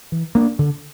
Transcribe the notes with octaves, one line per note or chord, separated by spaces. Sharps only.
E3
A#3 D4
D3